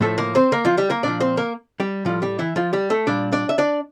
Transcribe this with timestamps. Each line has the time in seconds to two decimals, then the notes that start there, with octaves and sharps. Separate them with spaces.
0.01 A2 F3 A3 A4
0.18 A#3 A#4
0.35 C4 C5
0.52 A#3 A#4
0.65 F3 F4
0.78 G3 G4
0.90 A#3 A#4
1.03 A#2 F3 D4 D5
1.20 C4 C5
1.37 A#3 A#4
1.80 G3 G4
2.05 A2 F3 G3 F4
2.22 G3 G4
2.39 E3 E4
2.56 F3 F4
2.73 G3 G4
2.90 A3 A4
3.07 A#2 G3 D4 D5
3.32 D4 D5
3.49 E5
3.58 D4 D5